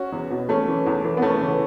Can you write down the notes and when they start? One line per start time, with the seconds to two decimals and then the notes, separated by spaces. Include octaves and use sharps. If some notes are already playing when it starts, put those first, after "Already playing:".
Already playing: C#4 F#4
0.12 E2
0.30 B2
0.49 E2 A3 C#4
0.68 E3
0.86 E2
1.04 E3
1.17 B3
1.22 E2 A3 C#4
1.41 C#3 E3